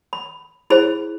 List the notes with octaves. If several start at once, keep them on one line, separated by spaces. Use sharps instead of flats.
B5
E4 G#4 C5 B5